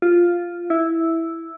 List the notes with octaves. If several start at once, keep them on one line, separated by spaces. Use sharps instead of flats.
F4
E4